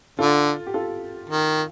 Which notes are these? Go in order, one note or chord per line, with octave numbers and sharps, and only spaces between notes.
D3 F4 A4
G4
F4 A4
D#3